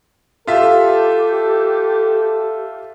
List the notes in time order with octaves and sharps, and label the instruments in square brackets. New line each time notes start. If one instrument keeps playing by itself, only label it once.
[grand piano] F4 E5 [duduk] G4 [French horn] A4